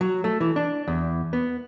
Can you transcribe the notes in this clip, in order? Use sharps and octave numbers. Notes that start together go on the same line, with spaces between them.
F#3
A3
E3
D4
E2
B3